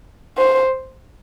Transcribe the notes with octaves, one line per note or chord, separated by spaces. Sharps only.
C5